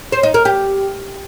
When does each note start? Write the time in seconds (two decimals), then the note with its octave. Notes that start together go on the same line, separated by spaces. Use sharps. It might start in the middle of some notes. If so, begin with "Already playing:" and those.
0.12 C5
0.23 D#4
0.34 A#4
0.45 G4